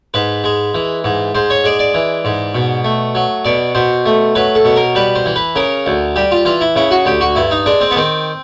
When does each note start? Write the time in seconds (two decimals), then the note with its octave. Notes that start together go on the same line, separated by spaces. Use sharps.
0.14 G#2 B4
0.44 G#3
0.75 E3
1.04 G#2
1.35 G#2 C5
1.50 C#5
1.64 G#3 D5
1.79 D5
1.94 E3
2.25 G#2
2.55 B2
2.84 A3
3.15 F#3
3.45 B2 D5
3.75 B2 C5
4.06 A3
4.35 F#3 B4
4.55 A4
4.65 B2
4.76 A#4
4.95 G3 B4
5.16 C5
5.26 E3
5.36 B4
5.56 C#3 A#4
5.86 D2
6.16 G3 G4
6.31 F4
6.45 E3 F4
6.61 E4
6.76 C#3 E4
6.91 F#4
7.05 D2 G4
7.21 F#4
7.35 G2 E4
7.51 D#4
7.66 G#3 D4
7.81 C4
7.91 B3
7.96 D#3 C4